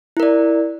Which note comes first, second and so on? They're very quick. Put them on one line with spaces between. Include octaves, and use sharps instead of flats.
E4 A#4 D5